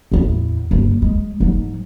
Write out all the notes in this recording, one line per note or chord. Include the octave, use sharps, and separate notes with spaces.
A1 E2
G2 A#3
G#3
G#2 F#3